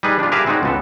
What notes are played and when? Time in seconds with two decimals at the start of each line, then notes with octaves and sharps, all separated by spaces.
0.03 G3 D#4 G#4 B4
0.19 D4 F4
0.32 G4 G#4 A#4 B4 E5 F5
0.46 G#3 C4 D#4 F#4 D5
0.63 C#2 B3 A4